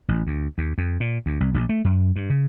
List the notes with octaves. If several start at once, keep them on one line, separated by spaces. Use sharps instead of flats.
A1
D2
D#2
F2
A#2
D2
C2
A#1
A3
F#2
G2
C#3